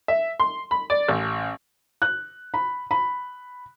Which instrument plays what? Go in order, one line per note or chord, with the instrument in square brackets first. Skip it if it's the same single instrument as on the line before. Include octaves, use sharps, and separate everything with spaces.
[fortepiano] E5
C6
B5
D5
A1
[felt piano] F#6
B5
B5